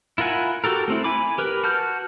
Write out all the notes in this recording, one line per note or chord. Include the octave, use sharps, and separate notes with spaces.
E4 F4 A#4 F#5 G#5
F#4 G4 A4 A#4
A3 C4 E4
G#5 B5 D6
G4 A#4 B4
F#4 A5 F6 G6